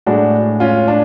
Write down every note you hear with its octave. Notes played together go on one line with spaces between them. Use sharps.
A2 G#3 D4 F#4
C#4 F4
D4